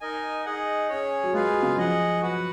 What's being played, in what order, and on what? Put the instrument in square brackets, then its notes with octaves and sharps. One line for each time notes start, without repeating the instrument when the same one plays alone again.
[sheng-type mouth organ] D#4 A#4 D#5 G#5
D#4 G#4 D#5 F#5
C#4 G#4 C#5
[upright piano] F#3
[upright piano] G#3 [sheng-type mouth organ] F4 G#4 B4 F5
[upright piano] F#3
C#3
[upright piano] F3 [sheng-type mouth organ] G#4 D#5 F#5
[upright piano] F#3 [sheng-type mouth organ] F#4 B4 F#5